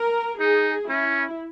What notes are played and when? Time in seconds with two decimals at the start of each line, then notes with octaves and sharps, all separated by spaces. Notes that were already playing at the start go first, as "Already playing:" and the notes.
Already playing: A#4
0.39 D#4 G#4
0.89 C#4 E4